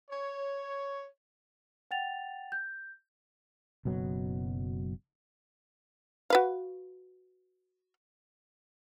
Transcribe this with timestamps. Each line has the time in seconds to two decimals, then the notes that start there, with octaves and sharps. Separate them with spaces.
0.10 C#5
1.91 F#5 G5 A6 F7
2.52 G6
3.85 F#1 B2 F#3
6.30 F#4 B4 F5